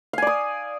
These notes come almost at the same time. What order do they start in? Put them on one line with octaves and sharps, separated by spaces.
F5 G#5 D5 D#6